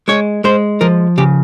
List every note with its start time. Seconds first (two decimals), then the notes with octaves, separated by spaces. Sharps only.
0.08 G#3 C#5
0.44 G#3 C5
0.81 F3 A#4
1.18 C#3 G4